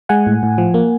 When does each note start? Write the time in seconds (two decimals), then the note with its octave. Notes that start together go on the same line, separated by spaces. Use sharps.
0.09 G#3 F#5 G#5
0.27 A2
0.43 A2
0.58 F3
0.74 A#3